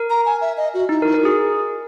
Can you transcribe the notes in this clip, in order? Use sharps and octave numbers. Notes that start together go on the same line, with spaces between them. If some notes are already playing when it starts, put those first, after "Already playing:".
Already playing: A#4
A#5
G#5
E5
D#5
F#4
D#4 E4
A#4
E4
A#4
F#4 G#4